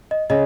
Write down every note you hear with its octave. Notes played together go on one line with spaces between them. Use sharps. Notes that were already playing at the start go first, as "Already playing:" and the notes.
D#5
C#3 D#5